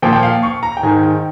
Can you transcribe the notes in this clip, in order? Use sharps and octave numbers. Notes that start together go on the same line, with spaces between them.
A#2 F3 G5
G5
F5
C#6
A#5
G5
G#2 D#3 G#5
G5